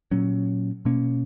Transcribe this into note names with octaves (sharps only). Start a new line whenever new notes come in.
A#2 F#3 C#4
B2 A#3 C#4